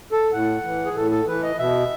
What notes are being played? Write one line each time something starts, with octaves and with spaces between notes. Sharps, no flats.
A4
A2 F#5
E3
G#4
A2 A4
A4
E3 B4
D#5
B2 E5